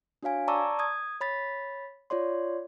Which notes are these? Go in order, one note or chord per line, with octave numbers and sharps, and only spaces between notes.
D4 F#4 C#5 F5 G#5
D5 A5 A#5 C#6 D6 E6
D#6 G#6
C#5 B5 A6 B6
F4 C#5 D5 C6